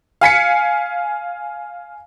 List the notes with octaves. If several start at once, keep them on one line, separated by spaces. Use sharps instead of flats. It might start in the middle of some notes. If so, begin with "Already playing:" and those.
F5 G#5 B6 C#7